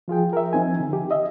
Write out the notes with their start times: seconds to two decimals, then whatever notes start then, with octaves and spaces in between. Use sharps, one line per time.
0.08 F3 F4 G#4 G5
0.33 A#4 E5
0.53 F3 C4 D#4 G#5
0.80 D3
0.93 G4
1.11 D#5 E5